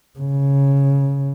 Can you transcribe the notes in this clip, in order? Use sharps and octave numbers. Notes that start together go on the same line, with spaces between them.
C#3